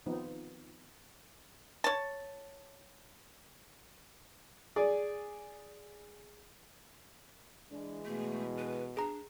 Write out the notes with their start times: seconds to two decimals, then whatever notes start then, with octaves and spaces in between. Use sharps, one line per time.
0.06 D#3 F3 B3 C4 D#4
1.84 C#5 A5
4.76 G#4 D5
7.71 E3 G#3 D4
8.05 B2 A3
8.58 B4
8.97 D4 G#4 A#5